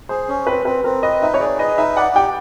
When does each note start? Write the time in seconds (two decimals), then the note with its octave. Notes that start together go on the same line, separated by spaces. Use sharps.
0.09 G#4 C5
0.28 C#4
0.47 C4 B4
0.65 C4 B4
0.84 C4 A#4
1.03 B4 D#5
1.22 D#4 E5
1.34 C#5
1.40 G#4 D5
1.59 B4 D#5
1.78 D#4 E5
1.97 D5 F#5
2.16 G4 G5